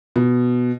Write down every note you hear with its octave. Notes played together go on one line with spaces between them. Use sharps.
B2